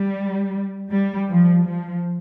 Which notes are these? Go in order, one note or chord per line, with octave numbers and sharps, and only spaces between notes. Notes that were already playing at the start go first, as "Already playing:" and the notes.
Already playing: G3
G3
F3
F3